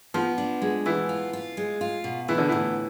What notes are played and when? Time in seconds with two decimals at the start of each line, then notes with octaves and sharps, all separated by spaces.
0.14 F3 B3
0.38 D4
0.62 G#3
0.85 E3 B3
1.09 F4
1.33 F4
1.57 G#3
1.81 F4
2.04 B2
2.28 E3 B3
2.38 D3
2.49 A2 E3